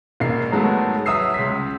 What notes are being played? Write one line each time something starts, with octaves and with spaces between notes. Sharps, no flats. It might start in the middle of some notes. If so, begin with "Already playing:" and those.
E1 A#3 C7
G#2 D#3 F#3 G#3 A3 B3
F#3 E5 D#6 E6 C7
C#2 B6